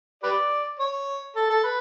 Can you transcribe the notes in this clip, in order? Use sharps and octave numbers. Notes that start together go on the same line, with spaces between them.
G4 B4 D5
C#5
A4
A4
B4